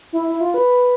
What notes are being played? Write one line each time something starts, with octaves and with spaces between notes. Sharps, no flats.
E4
E4
F4
B4